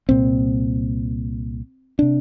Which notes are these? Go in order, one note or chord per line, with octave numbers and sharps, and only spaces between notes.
C2 A#2 C4
C3 D4